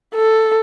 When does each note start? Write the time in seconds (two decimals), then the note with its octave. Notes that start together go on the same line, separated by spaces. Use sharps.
0.15 A4